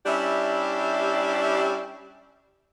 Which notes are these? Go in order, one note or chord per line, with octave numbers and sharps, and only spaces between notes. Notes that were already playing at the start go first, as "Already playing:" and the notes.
G3 C#4 D4 E4 G4 E5